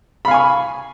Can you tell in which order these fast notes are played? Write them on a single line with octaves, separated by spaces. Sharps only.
B5 F5 G#5 C#6